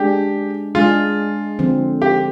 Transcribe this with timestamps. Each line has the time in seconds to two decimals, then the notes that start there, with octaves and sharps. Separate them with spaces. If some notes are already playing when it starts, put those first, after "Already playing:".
Already playing: G#3 D4 G4 G#4
0.75 G#3 D4 F4 G#4
1.59 D3 F3 C4
2.02 G4